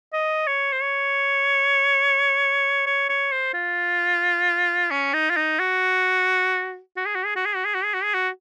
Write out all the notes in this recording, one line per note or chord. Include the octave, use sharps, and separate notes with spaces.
D#5
C#5
C5
C#5
C#5
C#5
C5
F4
C#4
D#4
F4
D#4
F#4
F#4
G#4
F#4
G#4
F#4
G#4
F#4
G#4
F#4
G#4
F#4
G#4
F#4